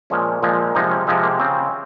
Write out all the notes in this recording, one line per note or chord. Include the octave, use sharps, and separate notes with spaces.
A#2 F3 G#3 C#4
A#2 F3 G#3
C3 F3 G#3 D#4
C#4
C3 F3 G#3 C4
A#3
C#3 C4